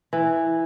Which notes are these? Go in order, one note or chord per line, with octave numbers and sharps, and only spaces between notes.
E3